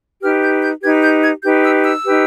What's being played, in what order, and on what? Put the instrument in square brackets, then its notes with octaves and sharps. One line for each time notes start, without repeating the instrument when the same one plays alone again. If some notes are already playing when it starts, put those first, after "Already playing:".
[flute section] D#4 G4 B4 F6
G6
G6
D#4 G4 B4 G#6
G6
G#6
D#4 G4 B4 G6
E6
E6
D#4 G4 B4